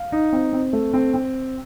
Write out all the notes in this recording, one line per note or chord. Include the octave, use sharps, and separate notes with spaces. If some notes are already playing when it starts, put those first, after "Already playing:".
Already playing: F5
D#4
C4
C4
A3
C4
C4